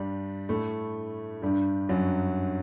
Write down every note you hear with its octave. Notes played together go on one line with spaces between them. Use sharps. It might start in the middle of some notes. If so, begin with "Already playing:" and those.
Already playing: G2 G3
A2 A3
G2 G3
F#2 F#3